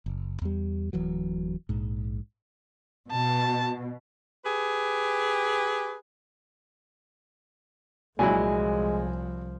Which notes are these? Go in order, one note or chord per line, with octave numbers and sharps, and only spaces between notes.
F#1
E2 G3
D1 E3 F#3
A#1 G#2
B2 A5
G4 G#4 B4
C2 A#2 F3 F#3 G#3 E4 G#5